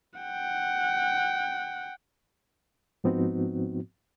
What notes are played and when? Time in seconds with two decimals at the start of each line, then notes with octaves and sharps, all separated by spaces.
0.19 F#5 G5
3.04 G#2 F3 B3 C4 D#4 F#4